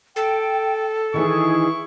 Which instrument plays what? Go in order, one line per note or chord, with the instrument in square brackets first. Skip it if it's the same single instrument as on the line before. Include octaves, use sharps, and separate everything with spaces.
[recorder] A4 [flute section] G5
[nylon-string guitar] D#3 E3 D#4 [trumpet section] E4 C#6 [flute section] G#4